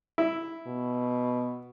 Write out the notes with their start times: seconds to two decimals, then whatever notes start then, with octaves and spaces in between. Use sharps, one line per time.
0.18 E4
0.67 B2